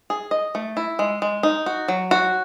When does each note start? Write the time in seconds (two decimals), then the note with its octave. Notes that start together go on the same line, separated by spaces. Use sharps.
0.10 G#4
0.31 D#5
0.55 A3
0.77 E4
0.99 G#3
1.22 G#3
1.43 D#4
1.66 F#4
1.88 F#3
2.11 F#4